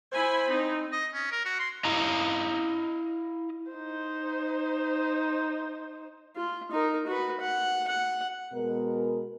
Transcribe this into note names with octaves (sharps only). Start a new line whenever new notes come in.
E4 C5 G#5 B5
C4 D#4
D#5
C#4
A#4
F#4
C6
E4 D#5 F5 A#5
D#4 C5
F4
D#4 A#4
F#4 B4
F#5
F#5
B2 G#3 B3 A#4